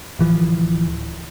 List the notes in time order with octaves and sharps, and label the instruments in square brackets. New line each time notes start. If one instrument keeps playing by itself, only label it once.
[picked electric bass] D1 E3 F3